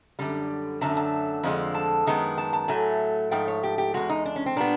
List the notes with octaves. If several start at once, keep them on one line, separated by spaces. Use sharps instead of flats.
F#2 D3 G3
F#2 D3 F#3 A3 A5
A5
F2 D3 F3 G#3
A5
F#2 D#3 G#3 B3
A5
A5
A2 F#3 A3 G#5
G#2 F3 A3 G5
C#5
G4
G4
E2 B2 G#3 F#4
D#4
D4
C#4
C4
A#2 G3 B3 D4